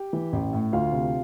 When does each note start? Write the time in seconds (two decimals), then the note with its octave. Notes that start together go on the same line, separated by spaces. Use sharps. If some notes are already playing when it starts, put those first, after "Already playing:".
Already playing: G4 G5
0.13 E3
0.33 A1
0.53 A2
0.72 D2 F4 F5
0.92 C3